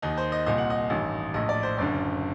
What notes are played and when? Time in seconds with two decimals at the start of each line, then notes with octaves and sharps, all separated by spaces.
0.02 D#2 D#3 D#4
0.17 C5
0.32 D#5
0.46 C2 A#2 D#5
0.58 F#5
0.70 D#5
0.90 A1 G2 D#3
1.34 A#1 A2 D#5
1.49 D5
1.63 C5
1.78 F#1 F#2 D3 D5